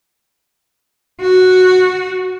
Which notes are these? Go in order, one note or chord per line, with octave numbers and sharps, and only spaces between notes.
F#4